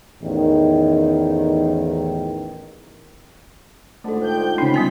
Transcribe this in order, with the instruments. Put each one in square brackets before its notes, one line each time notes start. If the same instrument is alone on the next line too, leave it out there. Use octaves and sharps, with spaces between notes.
[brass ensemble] A1 E2 D#3
[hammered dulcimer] G#2 D3 F4 [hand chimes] A3 A4
[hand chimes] C5 [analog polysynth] G5 G6
[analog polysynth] C#3 C#4 B5 [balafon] D#4
[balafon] G3 B3 G#5 [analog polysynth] B6